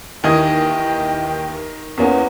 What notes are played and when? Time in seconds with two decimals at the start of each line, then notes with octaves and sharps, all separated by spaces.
0.24 D#2 D#3 E3 D#5 G5 D#6 G#6
1.98 E2 A#3 B3 C#4